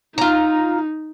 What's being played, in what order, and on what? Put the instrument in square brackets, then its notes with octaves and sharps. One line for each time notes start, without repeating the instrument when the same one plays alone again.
[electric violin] D#4 [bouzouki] F4 A#5